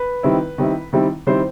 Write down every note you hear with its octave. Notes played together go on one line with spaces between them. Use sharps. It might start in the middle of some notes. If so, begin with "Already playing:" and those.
Already playing: B4
D#3 G3 C4 E4
D#3 G3 C4 E4
D#3 G3 C4 E4
D#3 G3 C4 E4 C5